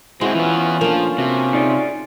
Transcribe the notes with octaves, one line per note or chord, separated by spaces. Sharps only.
G#3 C4 E4 F#4 C5 G#5
E3 B3 C#4 F4
F3 A#3 D4
C3 F#4
D#4 G#4 D5